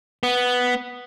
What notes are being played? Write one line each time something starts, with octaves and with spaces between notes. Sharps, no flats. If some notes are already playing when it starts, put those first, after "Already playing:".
B3